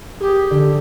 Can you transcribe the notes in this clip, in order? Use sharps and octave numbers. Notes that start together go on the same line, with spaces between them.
G4 G#4
D3